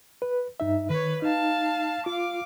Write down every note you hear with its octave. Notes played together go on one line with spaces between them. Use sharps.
B4
G2 D#4 E5
D#3 B4 C#5
D#4 F5 A5
F4 F5 D6